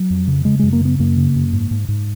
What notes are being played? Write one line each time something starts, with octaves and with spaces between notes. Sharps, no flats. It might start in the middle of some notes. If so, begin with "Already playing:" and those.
Already playing: F#3
F2
C#3
C#3 G#3
F#2 G#3
A#3
C#3 B3
F#2 A#3
C#3
F#2
G#2
G#2
G#2